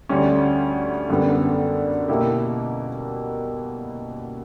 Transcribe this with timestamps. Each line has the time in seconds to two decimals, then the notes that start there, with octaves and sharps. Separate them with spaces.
0.09 D2 D3 G3 C#4
1.09 F#2 D3 G3 B3
2.08 B2 A#3 E4 G4